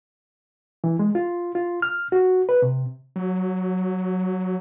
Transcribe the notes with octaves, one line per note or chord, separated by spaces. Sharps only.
E3
G#3
F4
F4
F6
F#4
B4
C3
F#3